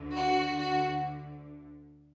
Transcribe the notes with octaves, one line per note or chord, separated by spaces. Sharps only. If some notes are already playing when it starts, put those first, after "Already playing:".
Already playing: D2 D3
F#4
F#4